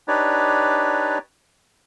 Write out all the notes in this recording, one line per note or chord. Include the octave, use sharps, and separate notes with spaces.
D4 D#4 G4 B4 C#5 D5